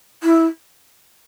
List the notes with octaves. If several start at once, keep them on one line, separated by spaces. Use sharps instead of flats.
E4